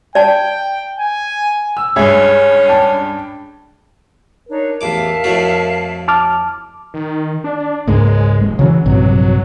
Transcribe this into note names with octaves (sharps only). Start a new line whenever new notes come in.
D5 G5 A5
G#5
E6
C#2 G2 C#4 G#4 E5 G#6
D4 G5 A5
D4 D#4 A#4 C#5
A1 E2 E5 F5 A5 D6
F2 A2 F#4
A5 D6 F6
D#3
D4
C#2 G#2 G#3 A#3
F1
C#3 E3 F#3 C#4
A#1 G2 C3 F#3